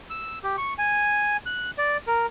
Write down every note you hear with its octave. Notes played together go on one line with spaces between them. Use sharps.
E6
G4
C#6
G#5
F#6
D5
A#4